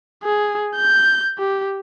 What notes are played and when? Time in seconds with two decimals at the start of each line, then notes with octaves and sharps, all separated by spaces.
0.23 G#4
0.76 G6
1.38 G4